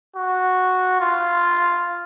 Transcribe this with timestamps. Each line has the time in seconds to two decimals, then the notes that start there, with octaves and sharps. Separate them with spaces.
0.16 F#4
1.00 F4